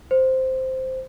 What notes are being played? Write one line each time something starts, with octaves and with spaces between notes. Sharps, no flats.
C5